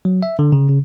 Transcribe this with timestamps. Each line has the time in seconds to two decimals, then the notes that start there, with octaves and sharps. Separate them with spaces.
0.05 F#3
0.23 E5
0.39 D3
0.52 C#3
0.69 C#3